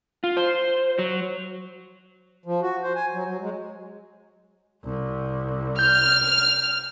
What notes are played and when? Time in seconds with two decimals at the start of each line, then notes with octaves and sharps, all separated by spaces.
0.24 F4
0.37 C5
0.99 F#3
2.45 F3
2.62 F#4
2.83 C5
2.95 G#5
3.13 F#3
3.27 F#3
3.41 G#3
4.84 C2
5.79 F6 G6